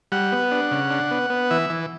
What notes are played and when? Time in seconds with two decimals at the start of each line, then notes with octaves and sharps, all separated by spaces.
0.12 G3 F#5
0.32 B3
0.51 D4
0.71 C#3
0.90 D4
1.11 B3
1.30 B3
1.51 E3 E5
1.70 E3